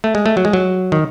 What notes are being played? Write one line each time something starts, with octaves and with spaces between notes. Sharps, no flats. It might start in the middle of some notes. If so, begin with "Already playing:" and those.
A3
G#3
A3
F#3
G#3
F#3
D#3